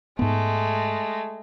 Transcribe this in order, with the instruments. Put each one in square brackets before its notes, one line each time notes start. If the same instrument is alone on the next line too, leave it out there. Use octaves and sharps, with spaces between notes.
[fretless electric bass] G#2 B3 [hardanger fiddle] G#3 A3